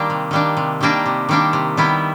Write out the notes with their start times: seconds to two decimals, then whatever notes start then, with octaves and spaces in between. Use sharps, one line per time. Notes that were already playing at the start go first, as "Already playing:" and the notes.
Already playing: D#3 G3 A#3 D4
0.10 C3
0.31 D#3 G3 A#3 D4
0.57 C3
0.81 D#3 G3 A#3 D4
1.06 C3
1.29 D#3 G3 A#3 D4
1.53 C3
1.77 D#3 G3 B3 E4